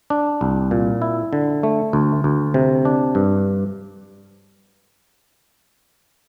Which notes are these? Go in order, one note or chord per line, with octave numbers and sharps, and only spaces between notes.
D4
C2
A#2
E4
D3
A3
D2
D2
C3
D4
G2